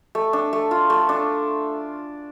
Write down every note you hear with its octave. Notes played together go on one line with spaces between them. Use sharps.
A3
D4
A3
F4
A3
D4